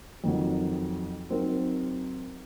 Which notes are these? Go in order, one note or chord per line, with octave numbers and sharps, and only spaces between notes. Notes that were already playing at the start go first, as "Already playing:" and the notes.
F2 D#3 F#3
F#3 C4 D#4 A#4